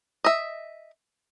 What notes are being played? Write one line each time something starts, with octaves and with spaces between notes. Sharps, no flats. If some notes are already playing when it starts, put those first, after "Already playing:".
D#5 E5